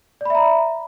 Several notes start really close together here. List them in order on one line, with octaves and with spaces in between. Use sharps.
D5 B5 E5 A#5